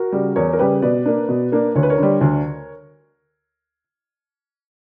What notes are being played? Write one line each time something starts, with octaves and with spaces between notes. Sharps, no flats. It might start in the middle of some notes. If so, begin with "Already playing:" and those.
Already playing: F#4 A#4
C#3 G3
E2 A#4 C#5
A#4
C#3 G3 G4 B4
B2 B4 D5
A#3 D4
B2
A#3 D4
D2 C#5
B4
A#4 C#5
D3 G3
D2